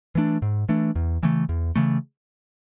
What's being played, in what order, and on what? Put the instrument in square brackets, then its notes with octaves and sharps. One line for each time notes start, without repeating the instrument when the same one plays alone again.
[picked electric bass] E3 A3 D4
G#2
E3 A3 D4
E2
C#3 E3 A3
E2
C#3 E3 A3